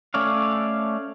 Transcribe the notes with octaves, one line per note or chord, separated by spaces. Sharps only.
A3 C#4 C#5 D5 F5